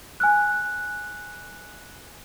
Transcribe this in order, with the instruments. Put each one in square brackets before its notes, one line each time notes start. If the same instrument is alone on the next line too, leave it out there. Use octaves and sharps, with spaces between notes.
[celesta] G#5 F6 F#6